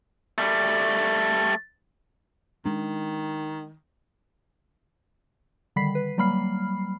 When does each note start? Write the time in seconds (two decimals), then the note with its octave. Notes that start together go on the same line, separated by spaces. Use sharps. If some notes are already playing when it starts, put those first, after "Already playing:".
0.38 G3 A3
2.65 D#3 G#3 D4
5.76 D3 D#3 G3 B5 B6 C7
5.95 B4
6.18 F#3 G3 A#3 B5 F6 C7